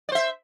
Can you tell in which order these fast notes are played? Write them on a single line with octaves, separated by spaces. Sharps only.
D5 C5 E5